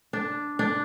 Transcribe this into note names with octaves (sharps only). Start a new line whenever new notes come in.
D4
D4